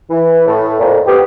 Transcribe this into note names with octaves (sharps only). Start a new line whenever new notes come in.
E3
A2
F2 A#2
B3 C4 G4